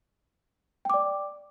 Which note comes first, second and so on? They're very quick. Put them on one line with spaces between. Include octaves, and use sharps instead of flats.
G5 D6 D5